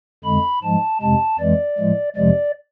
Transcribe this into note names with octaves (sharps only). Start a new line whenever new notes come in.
F2 D3 G#3 B5
G#2 F3 G#3 A5
F2 C3 G#3 A5
F2 E3 G#3 D5
A2 F3 G#3
F2 C3 F3 G#3 D5